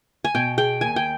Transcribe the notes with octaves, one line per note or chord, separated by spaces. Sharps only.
G#5
B2 G5
G#4 G5
D#2 G#5
G5